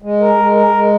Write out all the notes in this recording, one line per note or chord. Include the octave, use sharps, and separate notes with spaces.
G#3
A#4
G#3
A#4
G#3